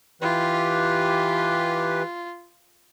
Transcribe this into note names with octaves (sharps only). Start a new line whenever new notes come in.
E3 F4 G4 B4